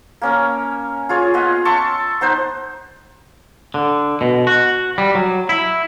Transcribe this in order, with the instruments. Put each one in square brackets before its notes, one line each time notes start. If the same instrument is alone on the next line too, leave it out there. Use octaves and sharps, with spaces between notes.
[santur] A#3 C#4 A#4
F4 G#4 C#5
B3 F4 D#5
E5 A5 C6 C#6
B3 D#4 C5 D#5
[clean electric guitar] D3
B2
F#4
G3
F#3
E4